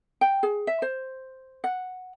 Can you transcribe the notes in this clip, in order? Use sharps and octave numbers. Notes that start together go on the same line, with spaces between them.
G5
G#4
E5
C5
F#5